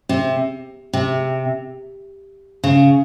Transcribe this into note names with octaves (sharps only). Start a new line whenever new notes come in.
C3
C3
C#3